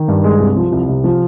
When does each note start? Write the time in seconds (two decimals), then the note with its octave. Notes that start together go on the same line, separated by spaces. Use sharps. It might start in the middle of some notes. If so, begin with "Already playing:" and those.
Already playing: D#3
0.08 G2
0.24 G#3
0.40 C2
0.56 F3
0.72 C2
0.88 C3
1.04 F3